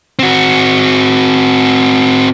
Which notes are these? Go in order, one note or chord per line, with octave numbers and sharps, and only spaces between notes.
C4 F#4